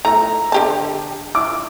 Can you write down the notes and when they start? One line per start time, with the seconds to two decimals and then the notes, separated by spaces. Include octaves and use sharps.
0.05 A3 A#5
0.52 D3 G4 A5
1.35 D6